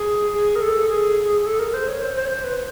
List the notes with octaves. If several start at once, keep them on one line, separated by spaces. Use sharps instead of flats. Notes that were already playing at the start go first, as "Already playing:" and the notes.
Already playing: G#4
G#4
A#4
A4
G#4
G#4
A4
A#4
C5
C#5
C5
C5
C#5
C5
B4